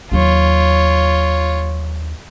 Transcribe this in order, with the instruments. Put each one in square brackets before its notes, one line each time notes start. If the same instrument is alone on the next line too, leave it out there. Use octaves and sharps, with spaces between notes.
[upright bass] D#2 F#3 [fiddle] F4 C#5